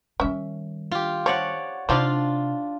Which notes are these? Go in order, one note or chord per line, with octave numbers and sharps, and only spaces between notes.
D#3 G3 C#4 E5
F4 G4
F3 C#5 D5 F#5
C3 F3 D4 D#4 F4 D5 F5